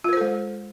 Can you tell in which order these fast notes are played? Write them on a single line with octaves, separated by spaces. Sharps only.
F4 A#4 C5 A4 G#3